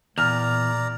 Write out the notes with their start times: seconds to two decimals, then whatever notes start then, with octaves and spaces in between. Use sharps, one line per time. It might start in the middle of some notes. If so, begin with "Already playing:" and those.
0.18 E2 A#2 D5 A#5 F6